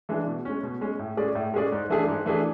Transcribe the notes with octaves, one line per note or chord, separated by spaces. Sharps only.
E3 G#3 D4
B2
G#3 C#4
B2
G#3 C#4
A2
G#3 C#4 G#4 D5
A2
G#3 C#4 G#4 D5
G#2
E3 A3 D4 G#4
G#2
E3 A3 D4 G#4